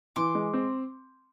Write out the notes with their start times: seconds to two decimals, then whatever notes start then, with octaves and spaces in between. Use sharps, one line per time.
0.16 E3 C6 D6
0.35 G#3
0.54 C4